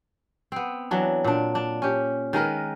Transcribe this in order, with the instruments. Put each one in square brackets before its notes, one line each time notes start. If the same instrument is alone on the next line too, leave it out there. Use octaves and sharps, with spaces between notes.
[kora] B3 C4
E3 F#3 D4
A#2 D4
D4
C#4 G4
D#3 G#3 A#4 B4